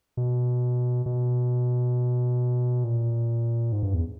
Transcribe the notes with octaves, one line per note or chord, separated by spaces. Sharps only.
B2
B2
A#2
G#2
G2
E2